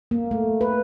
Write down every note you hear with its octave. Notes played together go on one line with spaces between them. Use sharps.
A#3
A3
B4